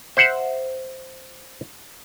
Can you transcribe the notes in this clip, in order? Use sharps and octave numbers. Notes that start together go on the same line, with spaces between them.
C5 E5 F#5